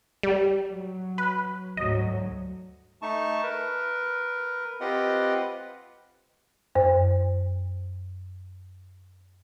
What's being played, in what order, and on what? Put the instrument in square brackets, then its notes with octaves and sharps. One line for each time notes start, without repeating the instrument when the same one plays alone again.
[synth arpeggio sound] G3
[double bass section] F#3
[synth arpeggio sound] B4
[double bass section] D2 G#2 F#3 [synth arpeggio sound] D#5
[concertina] A3 D#4 A5 C#6
A#4 B4
C4 F4 G4 B4 D#5 F#5
[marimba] F#2 C5